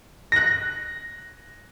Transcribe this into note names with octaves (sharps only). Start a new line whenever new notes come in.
F#6 A#6